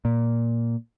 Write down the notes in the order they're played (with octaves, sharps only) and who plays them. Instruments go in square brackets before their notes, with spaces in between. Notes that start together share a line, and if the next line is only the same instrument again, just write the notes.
[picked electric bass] A#2